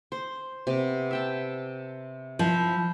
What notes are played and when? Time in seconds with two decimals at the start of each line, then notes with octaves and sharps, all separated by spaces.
0.12 C5
0.67 C3 B3 D6
1.11 E5 G5 A5
2.39 F3 E4 B5